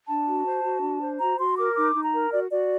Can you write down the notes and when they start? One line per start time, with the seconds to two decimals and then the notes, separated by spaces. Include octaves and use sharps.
0.07 D4 A5
0.27 F#4
0.45 C5
0.64 F#4
0.83 D4
1.01 C5
1.19 F#4 A#5
1.38 F#4 C6
1.57 A#4 D6
1.76 D#4 D6
1.94 D#4
2.04 A#5
2.13 A#4
2.31 F#4 D5
2.50 F#4 D5